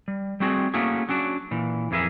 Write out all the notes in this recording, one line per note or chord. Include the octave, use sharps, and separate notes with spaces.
G3
G3 A3 C4 F#4 G#4
A3 A#3 C#4 E4 F#4 G#4
F#3 C#4 D4 F#4
A#2 E3
F2 E3 E4 G#4 A#4 E5